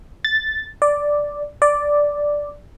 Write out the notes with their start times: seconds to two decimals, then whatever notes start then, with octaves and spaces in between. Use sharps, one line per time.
0.25 A6
0.82 D5
1.62 D5